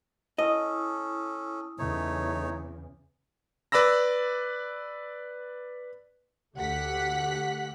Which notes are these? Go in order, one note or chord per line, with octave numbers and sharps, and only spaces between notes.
C#4 E4 A4 D#5 D#6
E2 C#3 A3 D#4 C#5
B4 D5 B5 E6 A#6
D2 A3 G4 F#5 F#6 B6